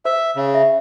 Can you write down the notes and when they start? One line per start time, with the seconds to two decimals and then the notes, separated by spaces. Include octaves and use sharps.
0.05 C5 E5
0.36 C#3
0.54 E5